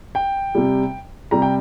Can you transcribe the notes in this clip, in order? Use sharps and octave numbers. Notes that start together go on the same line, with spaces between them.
G5
C3 G3
C3 G3 A#5
G5